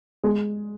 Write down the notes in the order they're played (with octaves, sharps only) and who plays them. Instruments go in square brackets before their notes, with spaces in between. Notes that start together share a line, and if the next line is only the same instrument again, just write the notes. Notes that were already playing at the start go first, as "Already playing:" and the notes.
[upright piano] G#3 G#4